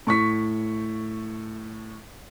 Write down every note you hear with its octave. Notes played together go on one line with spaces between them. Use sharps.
A2 C#6 B6